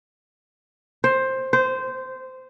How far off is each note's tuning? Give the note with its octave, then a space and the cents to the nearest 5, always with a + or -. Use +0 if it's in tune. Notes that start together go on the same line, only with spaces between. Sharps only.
C5 +10
C5 -15